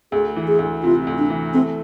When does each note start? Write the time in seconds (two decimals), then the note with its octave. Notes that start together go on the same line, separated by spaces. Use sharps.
0.12 D2 G#4
0.36 E3
0.48 G#4
0.59 D2
0.83 C3 F4
1.07 D2
1.18 D4
1.30 E3
1.53 A3 C4